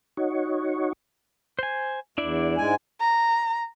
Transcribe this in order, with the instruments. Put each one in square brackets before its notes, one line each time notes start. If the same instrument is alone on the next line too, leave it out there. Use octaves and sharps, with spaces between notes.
[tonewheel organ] D#4 F#4 C#5
[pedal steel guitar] C5 G#5
[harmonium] E2 [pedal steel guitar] D4 E4 D5
[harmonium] G#2 G#3 G#5
[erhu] A#5